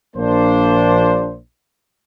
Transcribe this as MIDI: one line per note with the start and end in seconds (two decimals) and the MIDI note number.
0.16 1.38 34
0.16 1.38 58
0.16 1.38 62
0.16 1.38 72